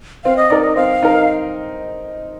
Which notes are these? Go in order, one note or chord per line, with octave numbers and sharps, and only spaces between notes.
C4 F5
D#5
D#4 A#4 D5
D#5
C4 F5
D#4 A#4